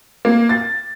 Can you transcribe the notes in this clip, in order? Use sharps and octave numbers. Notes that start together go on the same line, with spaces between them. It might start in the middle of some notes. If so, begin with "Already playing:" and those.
A#3
A6